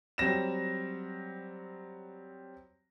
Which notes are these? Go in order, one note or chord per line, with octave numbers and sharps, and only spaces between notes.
F#3 G3 C4 A#6 E7